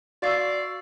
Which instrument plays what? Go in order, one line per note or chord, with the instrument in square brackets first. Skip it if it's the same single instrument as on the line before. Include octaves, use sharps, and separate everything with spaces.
[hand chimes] F#4 C7 [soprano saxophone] D5 [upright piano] F5 C#6 E6